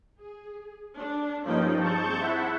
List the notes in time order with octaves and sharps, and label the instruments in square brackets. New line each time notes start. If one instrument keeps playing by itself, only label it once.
[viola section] G#4
D4
[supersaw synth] G2 F3 D#4 [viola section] A#3 C#4 G5
[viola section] C4 G#4 [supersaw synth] A5 C#6 G6
[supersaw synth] E4 E5 F#5